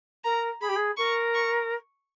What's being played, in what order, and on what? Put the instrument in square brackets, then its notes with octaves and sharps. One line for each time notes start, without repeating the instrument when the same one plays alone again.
[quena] A#4 [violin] A#5
[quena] G#4 [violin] B5
[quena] G4
G#4
[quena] A#4 [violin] C#6
[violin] C#6